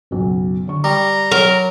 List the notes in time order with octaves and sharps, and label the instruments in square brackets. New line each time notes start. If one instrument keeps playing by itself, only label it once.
[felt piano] F#1 B1
D3 C#6
[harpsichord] G3 [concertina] A#5 [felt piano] D6
[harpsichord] F#3 [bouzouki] A#4